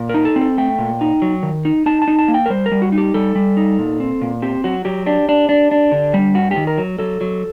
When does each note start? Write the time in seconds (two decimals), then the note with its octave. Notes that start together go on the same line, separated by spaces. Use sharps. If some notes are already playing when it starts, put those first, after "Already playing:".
Already playing: A#2
0.09 D#4 A#4
0.25 A4
0.36 C4
0.41 A4
0.58 A3 G5
0.78 A#2
1.01 D#4
1.22 F#3
1.43 D#3
1.65 D#4
1.86 D#4 A5
2.02 A5
2.08 D#4
2.19 A5
2.28 A#3
2.34 G5
2.46 A#4
2.50 G3 C5
2.66 A#4
2.72 G3
2.82 F#4
2.92 D#4
2.98 G4
3.14 G3 A4
3.35 G3
3.57 D#4
3.79 A#2
4.00 C4
4.21 A#2
4.42 C4 G4
4.64 F#3 F#4
4.85 F#3 G4
5.06 D4 G4
5.29 D4
5.49 D4
5.71 D4
5.92 D3
6.14 G3
6.34 G2 F#4
6.51 G4
6.56 D#3
6.67 A#4
6.78 F#3
6.99 F#3 A4
7.21 F#3